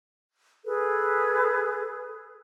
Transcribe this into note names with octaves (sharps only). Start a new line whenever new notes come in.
G#4 A4 B4